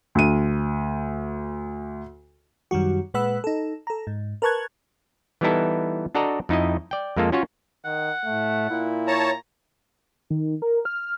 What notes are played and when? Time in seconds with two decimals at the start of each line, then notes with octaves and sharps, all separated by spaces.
0.15 D2 D#7
2.71 F#2 D#3 G3 F#4
3.14 A#2 G#3 B4 F#5 B5 E6
3.44 D#4 A4
3.87 A4 A#5
4.07 G#2
4.42 A#4 B4 A5 C#6 F#6 G#6
5.41 E3 G3 B3 D#4 E4 A4
6.15 D4 F#4 A4 D5 D#5 A#5
6.49 F2 D#4 E4 D#5
6.91 D5 G5
7.16 F2 G#3 A#3 F4 A4
7.32 C#4 F4 F#4 C#5
7.85 D#3 F#5
8.25 A2 A3
8.70 A#2 E4
9.08 C#5 A5 A#5
10.30 D#3
10.62 A#4
10.85 F6